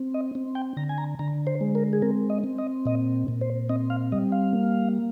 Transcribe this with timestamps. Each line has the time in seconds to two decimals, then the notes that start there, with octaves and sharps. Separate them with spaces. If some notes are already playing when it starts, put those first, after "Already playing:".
Already playing: C4
0.14 D#5
0.35 C4
0.55 G5
0.77 D3 A#5
0.89 G#5
0.98 A#5
1.19 D3 A#5
1.47 C5
1.61 G#3
1.75 A#4
1.93 G#4
2.02 C4 A#4
2.30 D#5
2.44 C4
2.58 D#5
2.85 A#2 D#5
3.28 A#2
3.41 C5
3.69 C4 D#5
3.90 F5
4.12 G3 D#5
4.32 F5
4.53 A#3